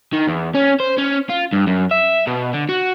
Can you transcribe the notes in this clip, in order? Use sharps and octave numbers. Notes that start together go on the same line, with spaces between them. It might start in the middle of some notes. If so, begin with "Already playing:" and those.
D#3
E2
C#4
C5
C#4
F4
G2
F#2
E5
B2
D3
F#4